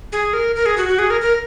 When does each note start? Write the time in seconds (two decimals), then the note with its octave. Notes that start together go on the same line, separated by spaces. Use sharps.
0.12 G#4
0.33 A#4
0.55 A#4
0.66 G#4
0.77 F#4
0.88 F#4
0.99 G#4
1.10 A#4
1.21 A#4